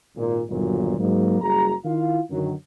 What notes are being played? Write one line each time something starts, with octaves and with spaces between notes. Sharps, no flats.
G#1 A#2
G1 D#2 A#2 F#3
G#2 F#3 A#3 D#4
F#1 G3 F#4 G#4 A#5
D#3 E4 F4 F5
F#2 D3 D#3 F#3